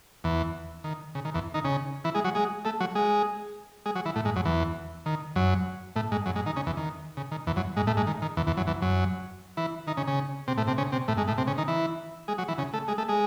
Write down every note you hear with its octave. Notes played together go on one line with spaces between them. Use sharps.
E2 E3
D#3
C#3
D#3
E2 E3
D#3 D#4
C#3 C#4
E3 E4
G#3 G#4
F#3 F#4
G#3 G#4
A3 A4
F#3 F#4
G#3 G#4
G#3 G#4
F#3 F#4
E3 E4
A2 A3
G#2 G#3
F#2 F#3
E2 E3
D#3
F#2 F#3
A2 A3
G#2 G#3
F#2 F#3
G#2 G#3
D#3 D#4
C#3 C#4
E2 E3
D#3
C#3
D#3
E2 E3
F#2 F#3
G#2 G#3
A2 A3
G#2 G#3
D#3
D#3
E2 E3
E2 E3
F#2 F#3
E2 E3
F#2 F#3
E3 E4
D#3 D#4
C#3 C#4
C#3 C#4
C3 C4
A2 A3
C3 C4
C#3 C#4
C3 C4
A2 A3
G#2 G#3
A2 A3
C3 C4
C#3 C#4
D#3 D#4
E3 E4
G#3 G#4
F#3 F#4
E3 E4
C#3 C#4
A3 A4
G#3 G#4
A3 A4
G#3 G#4